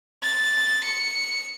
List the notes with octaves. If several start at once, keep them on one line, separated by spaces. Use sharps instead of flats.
A6
C#7